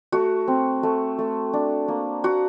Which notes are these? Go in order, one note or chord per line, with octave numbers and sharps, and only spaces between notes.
A3 F#4
C4
A3
A3
D4
A#3
A#3 F#4